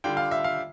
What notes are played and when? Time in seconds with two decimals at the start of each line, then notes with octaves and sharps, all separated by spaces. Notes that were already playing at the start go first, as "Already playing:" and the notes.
0.04 D3 G3 D4 F4 G5
0.17 F5
0.31 E5
0.44 F5